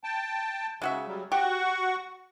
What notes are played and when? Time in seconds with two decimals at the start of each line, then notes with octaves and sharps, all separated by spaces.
0.04 G5 A5
0.82 C#3 G#3 F#4 E5
1.07 F#3 G3
1.32 F#4 G4 F#5 C#6